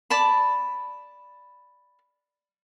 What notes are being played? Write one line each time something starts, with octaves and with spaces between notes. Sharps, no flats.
D5 A5 B5